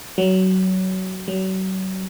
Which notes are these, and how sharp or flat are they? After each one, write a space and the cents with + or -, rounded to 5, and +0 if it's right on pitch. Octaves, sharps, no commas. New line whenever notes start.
F#3 +20
F#3 +35